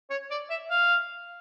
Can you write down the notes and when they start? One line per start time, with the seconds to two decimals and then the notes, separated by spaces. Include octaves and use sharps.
0.10 C#5
0.31 D5
0.50 E5
0.71 F5